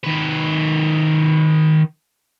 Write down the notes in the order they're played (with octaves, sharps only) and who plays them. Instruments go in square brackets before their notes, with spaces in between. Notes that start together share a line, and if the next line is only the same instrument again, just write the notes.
[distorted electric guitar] D#3 B4